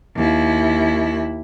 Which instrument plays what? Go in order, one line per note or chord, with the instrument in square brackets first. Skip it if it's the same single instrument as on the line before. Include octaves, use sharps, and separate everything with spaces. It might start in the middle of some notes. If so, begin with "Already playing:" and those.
[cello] D#2 E4